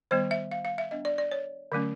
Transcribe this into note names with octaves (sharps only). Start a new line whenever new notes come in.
D#3 G3 B3 C5
E5
F5
F5
E5
G3 B3 D4 D#5
D5
D5
C#5
D3 F#3 A3 C#4